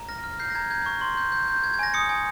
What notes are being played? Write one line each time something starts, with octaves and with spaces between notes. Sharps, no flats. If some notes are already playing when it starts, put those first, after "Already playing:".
Already playing: A#5
F6 A#6
F6
G6 C7
A#6
A#5 G#6
G6 G#6
C#6
C6
G6
G6
G6
G6 G#6
G#6
G#5 A#6
D#6 C#7
G#5